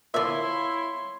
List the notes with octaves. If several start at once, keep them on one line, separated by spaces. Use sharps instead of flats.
A#2 D3 F3 E4 C#5 D5 E5 C6